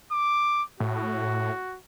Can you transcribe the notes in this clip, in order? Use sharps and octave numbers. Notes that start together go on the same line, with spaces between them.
D6
A2 F#4